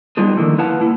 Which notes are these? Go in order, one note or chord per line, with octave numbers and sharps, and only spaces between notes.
F#3 G3 B3 D#4 F4 G#4
D3 D#3 F3 A#3 E4 A4
E4 B4 F5 F#5 A5
A#3 E4